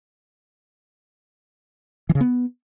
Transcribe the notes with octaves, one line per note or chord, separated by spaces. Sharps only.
E3
C#3
B3